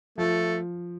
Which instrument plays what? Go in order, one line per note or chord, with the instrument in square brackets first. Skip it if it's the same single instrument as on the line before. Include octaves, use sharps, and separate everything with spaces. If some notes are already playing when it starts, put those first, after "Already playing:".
[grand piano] F3 [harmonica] A3